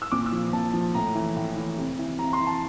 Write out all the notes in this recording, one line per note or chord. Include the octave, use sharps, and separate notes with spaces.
E6
A#2 D6
E6
F3
A#2 A5
F3
A2 A#5
E3
A2
E3
C3
E3
C3 A#5
C6
E3
A5